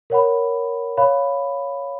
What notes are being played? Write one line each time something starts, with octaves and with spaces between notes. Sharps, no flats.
A#4 C#5 F#5 B5
C#5 F5 B5